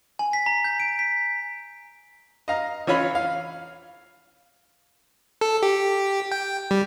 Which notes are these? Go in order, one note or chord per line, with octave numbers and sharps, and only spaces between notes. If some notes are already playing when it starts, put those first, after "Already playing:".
G#5
B6
A#5
G6
D7
B6
D#5 F5 A#5
E3 C#4 F4 C#5 B5
F5
A4
G4
G5
G3